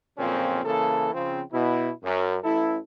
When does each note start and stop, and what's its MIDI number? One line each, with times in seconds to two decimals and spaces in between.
0.17 0.62 35
0.17 0.62 41
0.17 0.62 46
0.17 0.62 49
0.17 0.62 60
0.17 0.62 61
0.65 1.13 49
0.65 1.13 52
0.65 1.13 58
0.65 1.13 69
1.13 1.42 49
1.13 1.42 53
1.13 1.42 60
1.52 1.90 47
1.52 1.90 64
2.03 2.37 42
2.43 2.78 33
2.43 2.78 64
2.43 2.78 69